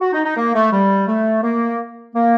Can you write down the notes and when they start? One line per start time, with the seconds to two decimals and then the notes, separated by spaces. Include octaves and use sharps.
0.01 F#4
0.13 D#4
0.25 D#4
0.37 A#3
0.55 A3
0.72 G3
1.08 A3
1.43 A#3
2.14 A#3